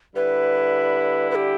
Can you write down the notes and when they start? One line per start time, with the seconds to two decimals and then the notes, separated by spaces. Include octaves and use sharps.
0.16 D3 G3 E4 B4
1.30 B4
1.35 G4